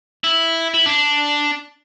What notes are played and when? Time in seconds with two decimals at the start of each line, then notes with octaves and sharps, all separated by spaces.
0.24 E4
0.74 E4
0.86 D4